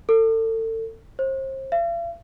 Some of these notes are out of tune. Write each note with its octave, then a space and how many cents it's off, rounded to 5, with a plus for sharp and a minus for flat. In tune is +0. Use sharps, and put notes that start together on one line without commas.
A4 +35
C5 +35
F5 -45